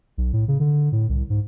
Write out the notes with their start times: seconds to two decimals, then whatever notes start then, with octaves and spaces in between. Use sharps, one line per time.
0.18 B1
0.33 A2
0.48 C#3
0.60 D3
0.92 A2
1.09 C2
1.30 G#2